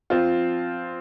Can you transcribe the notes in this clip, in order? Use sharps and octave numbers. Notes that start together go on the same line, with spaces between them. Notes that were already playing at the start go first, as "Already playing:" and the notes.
F3 C4 F4